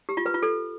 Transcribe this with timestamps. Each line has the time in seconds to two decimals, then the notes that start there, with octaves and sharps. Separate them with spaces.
0.09 G4
0.17 F4
0.26 B4
0.34 F4
0.43 A4